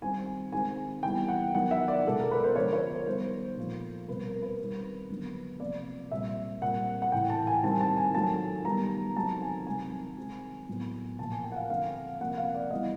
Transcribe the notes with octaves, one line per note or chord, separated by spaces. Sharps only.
D#3 G3 C4 G#5
D#3 G#3 C4 G#5
E3 G3 B3 G5
F#5
D#3 F#3 B3 F#5
E5
D5
B2 G#3 B3 A4
A#4
B4
C5
D3 F3 G#3 C#5
C#5
C5
D#3 G3 B3 C5
A#2 F3 A3
B2 G3 C4 B4
A#4
B4
D#3 G3 C4
D3 F#3 B3
C3 F3 A#3 D5
A#2 G3 C4 E5
A#2 G3 C4 F#5
F#5
A2 E3 A3 G5
A5
G#5
D#3 G3 C4 A5
A5
G#5
D#3 F#3 A3 A5
D#3 G3 B3 A#5
D#3 F#3 A3 C4 A5
G#5
C3 D#3 F#3 G#5
D#3 G#3 C4
A2 F#3 B3
A#2 F3 A#3 A5
G#5
G5
F#5
F5
D3 F3 A3 C4 F5
C3 F3 A#3 F#5
F5
D5
E3 G3 B3 D#5